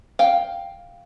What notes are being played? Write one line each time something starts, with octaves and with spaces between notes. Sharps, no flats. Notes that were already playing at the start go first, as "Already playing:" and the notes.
F5 G5